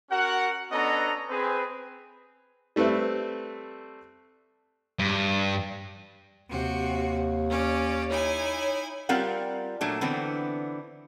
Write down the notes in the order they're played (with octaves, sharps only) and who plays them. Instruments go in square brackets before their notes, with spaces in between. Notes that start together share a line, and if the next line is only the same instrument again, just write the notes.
[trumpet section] C#4 F#4 A#4 F#5
B3 C#4 D4 A4 D#5 A#5
C4 G#4 B4
[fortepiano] G3 A3 C4 B4 E5
[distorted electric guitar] G2
[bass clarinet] D#2 [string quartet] C3 F#4
[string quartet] C#4 D5
[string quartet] D#4 E4 G#5 [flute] C#5
[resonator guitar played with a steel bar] G3 C4 F4 A#4 F5 F#5
A#2 F#3 A3 D4
D3 E3 B3 C4